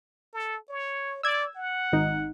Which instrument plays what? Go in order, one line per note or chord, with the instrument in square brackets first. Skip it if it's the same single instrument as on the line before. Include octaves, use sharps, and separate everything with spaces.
[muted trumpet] A4
C#5
[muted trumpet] D5 [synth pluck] E6 G#6
[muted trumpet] F#5
[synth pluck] G#1 D#4